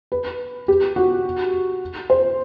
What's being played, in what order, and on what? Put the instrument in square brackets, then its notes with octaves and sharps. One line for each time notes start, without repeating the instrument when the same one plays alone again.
[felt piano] B4
G4
F#4
C5